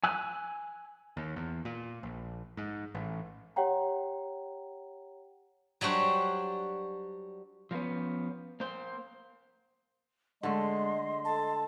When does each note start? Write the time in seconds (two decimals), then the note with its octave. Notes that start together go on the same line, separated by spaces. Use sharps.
0.04 G#5 E6 F#6
1.17 D#2
1.36 E2
1.65 A#2
2.03 A#1
2.57 G#2
2.95 A1
3.56 G4 C#5 F#5 G5 A#5
5.81 F#3 G3 D4 F#4 C5
7.71 F3 G#3 A3 B3 C#4
8.60 A#3 C5
10.43 D3 G#3 A3 D#5 C6
11.25 A4 A5